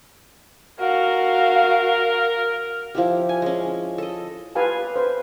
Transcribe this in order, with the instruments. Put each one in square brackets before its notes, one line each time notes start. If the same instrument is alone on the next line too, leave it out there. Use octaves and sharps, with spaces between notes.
[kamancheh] F#4 F5 [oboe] A#4
[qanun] F3 E4 G4
G#5
G#3 C#4
A4 D#5
[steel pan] F4 G4 B4 F5 G#5 A5
B4 C5